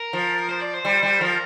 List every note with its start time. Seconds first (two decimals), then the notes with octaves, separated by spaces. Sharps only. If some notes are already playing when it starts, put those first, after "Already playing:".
Already playing: A#4
0.13 F3
0.49 C5
0.62 D5
0.74 C5
0.85 G3
1.03 G3
1.21 F3 A#4